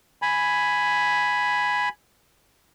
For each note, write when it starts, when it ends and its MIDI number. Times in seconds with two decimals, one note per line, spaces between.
0.22 1.89 80
0.22 1.89 83